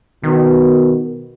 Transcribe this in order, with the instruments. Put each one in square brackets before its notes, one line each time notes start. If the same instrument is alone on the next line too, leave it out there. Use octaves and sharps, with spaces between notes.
[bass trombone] B2 [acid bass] D#3